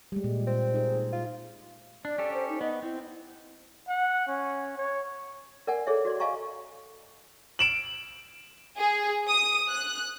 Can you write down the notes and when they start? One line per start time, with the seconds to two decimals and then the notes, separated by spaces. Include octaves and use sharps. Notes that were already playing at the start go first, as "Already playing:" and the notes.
0.12 G3 G#3
0.24 A#2
0.47 C4
0.74 D#4 G#4
1.13 F4
2.05 D4 D5
2.18 C#4 G4 A4
2.34 C5
2.48 D#4
2.61 B3 D#5
2.82 C4 E4
3.88 F#5
4.28 C#4
4.78 C#5
5.67 A#4 D5 F#5 G#5
5.87 G#4 A4 C#5 D5 E5
6.05 F#4 D5 C6
6.20 D#5 F5 G#5 A#5 C#6
7.59 D7 E7 F#7
8.78 G#4
9.28 D#6
9.70 F#6